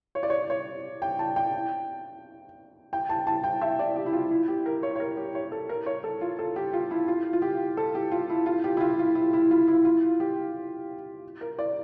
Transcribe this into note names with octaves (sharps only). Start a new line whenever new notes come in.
C#5
D5
C#5
C#5
G5
A5
G5
G5
A5
A5
G5
E5
D5
G4
E4
F4
E4
G4
A#4
C#5
C#5
A#4
G4
C#5
A4
A#4
C#5
A4
F4
A4
G4
F4
E4
F4
F4
G4
A4
G4
F4
E4
F4
G4
E4
F4
F4
E4
E4
F4
E4
F4
G4
A#4
D5